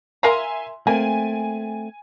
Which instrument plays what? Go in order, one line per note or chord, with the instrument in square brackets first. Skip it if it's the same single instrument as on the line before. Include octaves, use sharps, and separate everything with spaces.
[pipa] A#4 F5 A#5 [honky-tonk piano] E5 G#5 C6
[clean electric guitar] A3 C4 [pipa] A#3 [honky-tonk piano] G#5